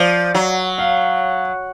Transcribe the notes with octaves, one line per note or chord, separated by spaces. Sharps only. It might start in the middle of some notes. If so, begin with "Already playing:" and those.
Already playing: F3 D5
F#3
F5